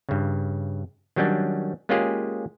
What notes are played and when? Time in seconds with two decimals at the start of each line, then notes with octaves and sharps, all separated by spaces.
0.09 G2 C#3
1.16 D#3 F#3 G3 C#4 D4
1.89 G#3 A#3 C#4 F4 G4 G#4